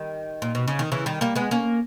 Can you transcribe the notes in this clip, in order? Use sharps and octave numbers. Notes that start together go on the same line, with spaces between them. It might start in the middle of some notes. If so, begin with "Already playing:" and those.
Already playing: D#3 G3
A#2
B2
C#3
D#3
C#3 E3
D#3 G3
G3 A#3
G#3 B3
A#3 C#4